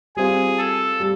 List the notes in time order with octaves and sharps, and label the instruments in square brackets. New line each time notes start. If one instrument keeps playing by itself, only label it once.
[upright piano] G3 C4 F4 [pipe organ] G#4
[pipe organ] A4
[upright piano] G3